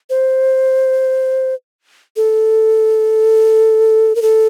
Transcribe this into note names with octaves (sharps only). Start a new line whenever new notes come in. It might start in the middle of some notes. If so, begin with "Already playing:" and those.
C5
A4
A#4
A4